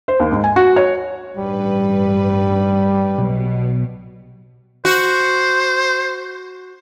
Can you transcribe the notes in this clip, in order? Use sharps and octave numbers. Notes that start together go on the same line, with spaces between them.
C5
D#2
G#2
G#5
F#4
C#5
A1 G2 G3 B4
B1 B2
F#4 C5